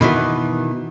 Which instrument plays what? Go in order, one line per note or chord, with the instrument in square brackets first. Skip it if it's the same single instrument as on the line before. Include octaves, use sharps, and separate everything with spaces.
[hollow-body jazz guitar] B2 D#3 E3 B3